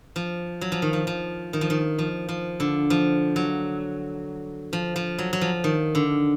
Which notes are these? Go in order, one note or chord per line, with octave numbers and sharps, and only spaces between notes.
F3
F#3
F3
D#3
F3
F3
D#3
F3
D#3
F3
F3
D3
F3
F#3
F3
F3
F#3
F#3
F3
D#3
D3